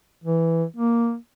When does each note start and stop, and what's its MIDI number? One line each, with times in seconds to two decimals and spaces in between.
0.24 0.64 52
0.76 1.15 58